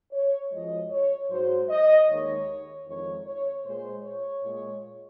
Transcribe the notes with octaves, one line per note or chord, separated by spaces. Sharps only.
C#5
F#2 F3 G#3 D#5
C#5
G#2 F#3 C5
D#5
D#2 D#3 G#3 C#5
F2 D#3 G#3 C#5
C#5
A#2 G#3 C5
C#5
A#2 G#3